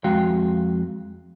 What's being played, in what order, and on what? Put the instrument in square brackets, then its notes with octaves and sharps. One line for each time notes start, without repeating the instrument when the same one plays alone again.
[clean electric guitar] F2 G#3 F#4 F5 G5